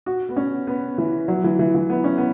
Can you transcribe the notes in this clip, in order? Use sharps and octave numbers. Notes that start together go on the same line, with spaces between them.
F#4
B3
C#4
B3
E3
F#3
E3
E3
E3
B3
C#4
B3